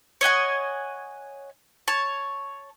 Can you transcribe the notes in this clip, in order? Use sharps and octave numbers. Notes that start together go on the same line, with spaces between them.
C#5 D#5 F#5 G#5
C#5 A5